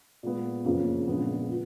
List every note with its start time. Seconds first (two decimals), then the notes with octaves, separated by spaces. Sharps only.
0.23 A#2 G#3 B3
0.64 F#1 F2 C#3 F3 A#3
1.07 A#1 A#2 G#3 B3
1.49 F4